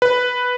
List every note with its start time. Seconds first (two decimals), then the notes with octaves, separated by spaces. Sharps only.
0.02 B4